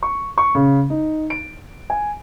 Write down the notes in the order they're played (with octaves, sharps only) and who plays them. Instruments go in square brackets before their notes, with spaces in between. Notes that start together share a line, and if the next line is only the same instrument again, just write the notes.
[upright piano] C#6
C#6
C#3
D#4
D7
G#5